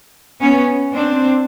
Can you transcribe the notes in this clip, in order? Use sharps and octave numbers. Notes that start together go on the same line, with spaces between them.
B3 C#4
C4 D4